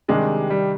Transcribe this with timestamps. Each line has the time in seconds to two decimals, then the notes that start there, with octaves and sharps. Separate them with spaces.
0.08 C3 D#3 G3 G#3 D4
0.50 G3